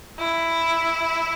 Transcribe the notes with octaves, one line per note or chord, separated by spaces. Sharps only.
E4